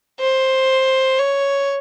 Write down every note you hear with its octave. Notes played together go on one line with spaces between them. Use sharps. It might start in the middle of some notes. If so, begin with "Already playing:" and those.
C5
C#5